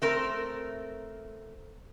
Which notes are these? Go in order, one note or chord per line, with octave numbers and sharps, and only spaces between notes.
A3 C4 A#4